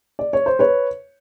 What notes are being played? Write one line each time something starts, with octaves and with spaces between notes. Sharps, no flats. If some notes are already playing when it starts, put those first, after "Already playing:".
D5
C#5
C5
B4 C#5